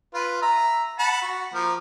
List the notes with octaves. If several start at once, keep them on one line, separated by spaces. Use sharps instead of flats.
F4 B4
E5 A#5
F#5 A5 B5
F#4
F3 A#3